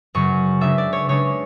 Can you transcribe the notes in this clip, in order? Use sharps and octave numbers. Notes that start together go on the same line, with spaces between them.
F#2 C#3 F#3 C#6
C#3 G#3 D4 E5
D5
C#5
C#3 G#3 D4 C#5